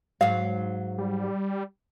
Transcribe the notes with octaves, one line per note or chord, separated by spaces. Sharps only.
G#2 F#3 F5
G3